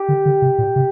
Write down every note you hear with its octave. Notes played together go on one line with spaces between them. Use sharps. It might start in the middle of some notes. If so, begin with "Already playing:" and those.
Already playing: G4
D3
D3
C3
A#2
C3